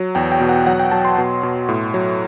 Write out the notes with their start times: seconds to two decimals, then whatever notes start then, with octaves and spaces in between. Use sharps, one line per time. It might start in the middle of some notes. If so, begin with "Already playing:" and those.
Already playing: F#3
0.15 E2 G5
0.32 G5
0.40 B2
0.49 F#5
0.66 F#3 F#5
0.80 G5
0.91 F#3 A5
1.05 C6
1.18 B2
1.43 B2
1.69 A2
1.94 F#3